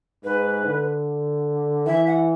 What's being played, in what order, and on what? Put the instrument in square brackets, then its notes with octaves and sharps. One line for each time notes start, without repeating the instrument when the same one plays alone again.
[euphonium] G#2 [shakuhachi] B4
[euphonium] D3
[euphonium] E3 [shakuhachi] E5
[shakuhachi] F#5